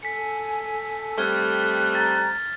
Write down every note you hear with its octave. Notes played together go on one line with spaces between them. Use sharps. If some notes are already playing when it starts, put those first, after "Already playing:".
A4 G#5 B6 C#7
G3 A3 C4 F6 F#6 G#6
A#5 A6